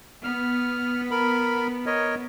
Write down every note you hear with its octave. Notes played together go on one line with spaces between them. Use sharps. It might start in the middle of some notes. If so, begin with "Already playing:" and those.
B3 F6
A#4 B5
A#4 C#5 D#5